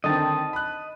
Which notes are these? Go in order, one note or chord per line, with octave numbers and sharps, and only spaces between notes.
D3 D#3 C4 D#5 A5
B5 F#6